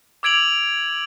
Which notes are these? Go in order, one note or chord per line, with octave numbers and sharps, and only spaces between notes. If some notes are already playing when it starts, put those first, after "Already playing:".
D6 E6 G#6 D7 F7 F#7